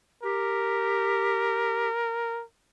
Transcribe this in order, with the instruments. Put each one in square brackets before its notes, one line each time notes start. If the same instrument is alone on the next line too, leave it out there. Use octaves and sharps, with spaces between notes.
[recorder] G4 [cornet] A#4